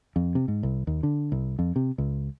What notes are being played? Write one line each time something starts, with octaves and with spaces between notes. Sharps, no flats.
F2
C3
G#2
C2
D#2
D3
C2
F2
C3
C#2